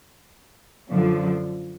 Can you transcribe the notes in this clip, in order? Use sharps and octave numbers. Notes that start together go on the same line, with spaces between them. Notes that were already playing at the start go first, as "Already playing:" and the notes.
F#2 D3 F3